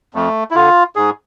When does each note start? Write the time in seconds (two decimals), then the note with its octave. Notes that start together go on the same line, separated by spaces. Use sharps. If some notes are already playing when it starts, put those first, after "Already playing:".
0.14 F2 A3
0.51 E4
0.55 D3 F4
0.96 G#2 G#4